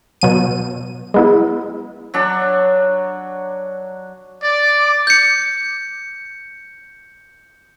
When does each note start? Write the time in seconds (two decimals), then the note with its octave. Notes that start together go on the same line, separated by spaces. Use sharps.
0.22 B2 F#3 D#7
1.14 G#3 B3 E4
2.14 F#3 D4
4.43 D5 D6
5.07 G6 C#7